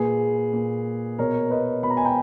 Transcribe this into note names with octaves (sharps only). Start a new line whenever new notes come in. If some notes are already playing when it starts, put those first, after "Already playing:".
Already playing: A#2 G#4 B4
A#2
B2 A#4 C#5
B4 D#5
B2 B5
A#5
G#5
G5 A#5